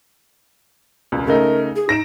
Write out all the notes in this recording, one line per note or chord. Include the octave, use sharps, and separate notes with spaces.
E1 C#2
C#3 A3 D#4 A#4
G#4
D#4 A#6 D7 E7